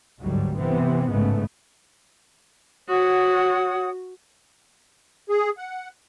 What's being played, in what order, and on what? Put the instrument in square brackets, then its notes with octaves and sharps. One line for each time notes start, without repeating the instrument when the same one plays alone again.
[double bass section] G1 D2 G#2 F#3 G3
C3 E3 B3 C4
A1 G#2 C#3 A3 B3
[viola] F#4 [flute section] C#5 F#5 D#6
[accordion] G#4
F#5